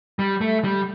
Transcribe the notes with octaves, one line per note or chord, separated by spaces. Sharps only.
G3
A3
G3